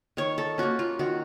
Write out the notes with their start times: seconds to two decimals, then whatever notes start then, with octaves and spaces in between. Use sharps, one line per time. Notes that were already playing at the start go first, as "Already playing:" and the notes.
0.17 D#3 C#5
0.38 A4
0.58 A#3 C#4 F#4
0.79 F4
0.99 D#3 F#4